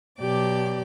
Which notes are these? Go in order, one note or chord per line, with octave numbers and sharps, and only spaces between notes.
B2 F#3 G4 D5 D6